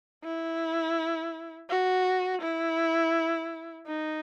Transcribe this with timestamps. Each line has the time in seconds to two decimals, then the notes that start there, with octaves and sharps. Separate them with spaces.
0.24 E4
1.69 F#4
2.42 E4
3.87 D#4